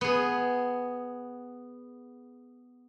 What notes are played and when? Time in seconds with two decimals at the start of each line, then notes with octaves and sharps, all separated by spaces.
0.01 B3 G#4